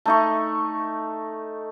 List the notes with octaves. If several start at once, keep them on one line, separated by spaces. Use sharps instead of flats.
A3 D#4 C#6